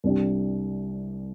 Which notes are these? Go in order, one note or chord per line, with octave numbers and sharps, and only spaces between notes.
C2 C3 G3 D4 G4